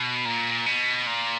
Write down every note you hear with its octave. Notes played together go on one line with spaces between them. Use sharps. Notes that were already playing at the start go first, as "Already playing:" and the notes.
Already playing: B2
A#2
B2
A#2